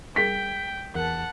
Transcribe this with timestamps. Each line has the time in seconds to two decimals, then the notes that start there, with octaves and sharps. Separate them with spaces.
0.16 G3 G#4 A#4 G5 B6
0.95 E2 A#4 F#5 A5